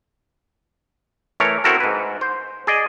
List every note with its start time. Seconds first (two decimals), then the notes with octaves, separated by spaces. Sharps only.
1.40 E3 A3 A#4 C#5
1.64 C4 E4 F#4 A4 A#4
1.80 G#2 B4
2.21 C5
2.67 G#4 D5 D#5